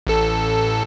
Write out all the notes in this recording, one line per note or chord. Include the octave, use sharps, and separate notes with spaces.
A1 A4